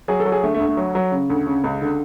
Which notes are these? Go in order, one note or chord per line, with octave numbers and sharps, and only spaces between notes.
F#3 G#4
A4
F#3
G#4
D3 A3
A3
D2
A3
F#3
F#3
C#3
D2
C#3
C#2
D3